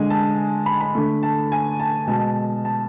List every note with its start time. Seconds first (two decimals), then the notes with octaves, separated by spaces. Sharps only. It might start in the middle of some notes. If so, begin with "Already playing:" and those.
Already playing: D3 G#3 G#5
0.10 A5
0.66 B5
0.81 B5
0.95 D3 A3
1.23 A5
1.52 G#5
1.80 A5
2.08 B2 G#3 A5
2.65 A5